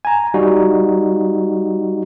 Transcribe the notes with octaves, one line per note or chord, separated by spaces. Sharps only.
G#5 A#5
G3 D#4 F#4